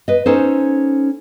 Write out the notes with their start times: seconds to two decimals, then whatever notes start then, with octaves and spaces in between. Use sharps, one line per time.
0.08 B4 D#5
0.26 C#4 D#4 A4 C5